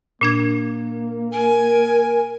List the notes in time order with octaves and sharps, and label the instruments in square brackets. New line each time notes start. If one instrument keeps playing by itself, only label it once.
[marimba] A#2 D4 G#6 [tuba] A#3
[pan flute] A#4 [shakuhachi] G#5